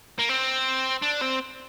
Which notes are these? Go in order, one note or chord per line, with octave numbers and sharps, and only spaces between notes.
A#3
C4
D4
C4